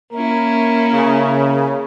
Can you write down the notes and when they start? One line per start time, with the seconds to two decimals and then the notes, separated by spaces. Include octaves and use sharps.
0.13 A#3 C#4 E4 A#4
0.92 C#3